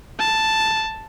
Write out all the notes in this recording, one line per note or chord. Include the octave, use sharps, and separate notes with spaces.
A5